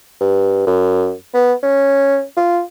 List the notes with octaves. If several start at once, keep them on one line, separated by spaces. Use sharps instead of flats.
G2
F#2
B3
C#4
F4